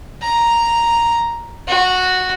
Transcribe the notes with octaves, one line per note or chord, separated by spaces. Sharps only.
A#5
F#4